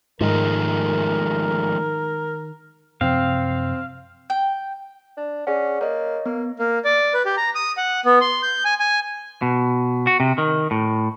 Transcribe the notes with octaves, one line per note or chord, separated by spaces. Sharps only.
G#2 D#3 F3 G#3 A3 A#4
F#2 C3 F3 C4 F5
G5
D4
C#4 G#4 D5 F#5
A#3 C#5 D#5
A#3 B3
A#3
D5
B4
G4
A#5
D#6
F#5
B3
C6
G6
G#5
G#5
B2
F#4
C3
D#3
A2